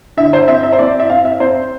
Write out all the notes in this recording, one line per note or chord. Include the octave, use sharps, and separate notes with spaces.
D3 E5
C5
C4 E5
E5
C5
C4 D5
E5
C4 F5
E5
C4 C5